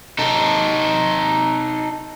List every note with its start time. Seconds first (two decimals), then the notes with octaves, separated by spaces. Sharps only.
0.19 D#4 A4